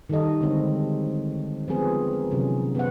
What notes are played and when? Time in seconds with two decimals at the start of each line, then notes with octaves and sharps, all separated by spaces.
0.10 D#3 G3 G4 A4 D#5
0.41 D3 G3 G#3 C4 C#5
1.68 F3 G#3 B3 C4 G#4 B4
2.13 A#4
2.31 C3 D#3 F#3 C#4
2.75 B3 C4 B4 C5 F#5